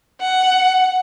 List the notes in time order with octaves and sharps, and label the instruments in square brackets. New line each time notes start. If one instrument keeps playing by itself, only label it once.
[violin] F#5